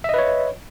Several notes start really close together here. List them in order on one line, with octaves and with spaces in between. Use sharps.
E5 D#5 B4 C#5